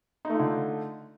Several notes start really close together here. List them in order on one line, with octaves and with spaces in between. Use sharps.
D#4 A3 F4 D3